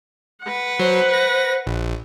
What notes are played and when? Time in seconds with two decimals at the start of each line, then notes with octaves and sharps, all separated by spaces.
0.43 B4 F#5
0.79 F#3 C5
1.14 A#6
1.67 A#1